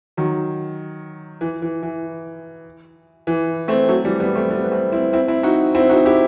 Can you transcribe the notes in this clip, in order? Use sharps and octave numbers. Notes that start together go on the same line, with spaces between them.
D#3 F#3
E3
E3
E3
E3
A3 C4
F#3 A3
E3 G3
G3 B3
A3 C4
G3 B3
B3
A3 C4
C4 E4
C4 E4
C4 E4
D#4 F#4
C4 E4
D#4 F#4
E4 G4